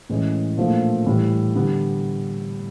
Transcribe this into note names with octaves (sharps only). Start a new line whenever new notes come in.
A2 E3 G#3 C#4
A#2 F3 A3 D4 F4
A2 E3 G3
D3 G3 B3